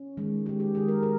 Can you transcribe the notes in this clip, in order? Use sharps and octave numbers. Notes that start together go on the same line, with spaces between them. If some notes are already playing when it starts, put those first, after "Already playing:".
Already playing: C#4
D#3 G#3
D#3 G#3 G4
G4
D#3 G#3 G#4
A#4
D#3 A#4